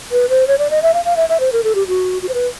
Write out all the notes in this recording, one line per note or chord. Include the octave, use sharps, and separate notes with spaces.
B4
C5
C#5
D5
D#5
E5
F5
F5
E5
E5
C5
A#4
A4
G4
F#4
F#4
C5
B4